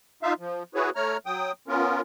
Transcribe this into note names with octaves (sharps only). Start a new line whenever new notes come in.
D#4 F4 E5 F5
F3
E4 F#4 G#4 B4 C#5
A3 C#5 A#5 F6
F#3 G5 D#6
B3 C#4 F4 A#4